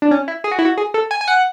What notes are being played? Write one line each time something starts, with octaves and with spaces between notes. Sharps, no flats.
D4
C#4
E4
G#4
F#4
E4
F#4
G#4
A4
G#5
G#5
F#5